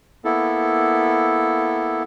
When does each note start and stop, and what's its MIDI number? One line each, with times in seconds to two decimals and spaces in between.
0.25 2.03 58
0.25 2.03 59
0.25 2.03 64
0.25 2.03 69